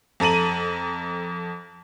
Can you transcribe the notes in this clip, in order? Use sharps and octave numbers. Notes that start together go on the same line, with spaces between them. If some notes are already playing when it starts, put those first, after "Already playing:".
F2 A4 A#5 D#7 F#7